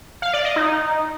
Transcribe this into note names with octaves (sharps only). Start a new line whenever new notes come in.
F5
D5
D#5
D#4